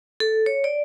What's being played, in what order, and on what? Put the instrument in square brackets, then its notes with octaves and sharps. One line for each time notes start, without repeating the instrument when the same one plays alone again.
[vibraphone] A4
C#5
D5